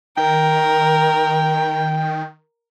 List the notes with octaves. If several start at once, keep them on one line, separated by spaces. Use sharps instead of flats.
D#3 A#4 G5